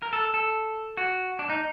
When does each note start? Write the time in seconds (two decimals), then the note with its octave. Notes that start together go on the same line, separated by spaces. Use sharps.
0.02 A#4
0.13 A4
0.34 A4
0.97 F#4
1.39 D4
1.49 D#4